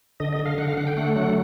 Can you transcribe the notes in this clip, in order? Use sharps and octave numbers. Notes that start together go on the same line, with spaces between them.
D3 D#5
D#5
D3
F5
D3 F#5
F5
D3 F#5
G5
A3 F#5
F#3 F#5